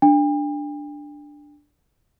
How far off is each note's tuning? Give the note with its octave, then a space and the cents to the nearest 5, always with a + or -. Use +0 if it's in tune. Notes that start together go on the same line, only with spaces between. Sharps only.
D4 +0 G5 +45